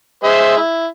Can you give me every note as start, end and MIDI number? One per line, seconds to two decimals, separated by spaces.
0.24 0.57 56
0.24 0.57 72
0.24 0.57 76
0.57 0.87 64